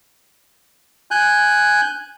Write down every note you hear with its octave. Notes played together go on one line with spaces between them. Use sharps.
G#5 F#6 G6